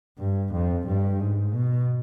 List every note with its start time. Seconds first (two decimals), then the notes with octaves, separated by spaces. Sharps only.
0.18 G2
0.52 F2
0.86 G2
1.20 G#2
1.53 B2